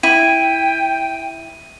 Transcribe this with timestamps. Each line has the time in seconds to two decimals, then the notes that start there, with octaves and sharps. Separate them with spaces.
0.03 E4 G5 D#7